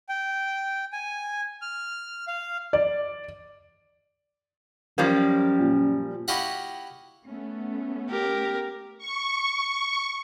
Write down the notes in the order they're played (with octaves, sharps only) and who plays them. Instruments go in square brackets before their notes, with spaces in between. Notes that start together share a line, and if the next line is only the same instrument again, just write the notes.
[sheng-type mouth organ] G5
G#5
F6
F5
[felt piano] D5
[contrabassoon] F#2 [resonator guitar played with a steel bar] F3 G3 A#3
[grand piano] A#2
[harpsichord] E4 F#4 G4 D#5 F5 F#5
[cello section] A3 B3 C#4
[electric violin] G4 A#4
[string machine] C#6